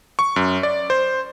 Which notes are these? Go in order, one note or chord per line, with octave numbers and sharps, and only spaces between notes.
C#6
F#2
D5
C5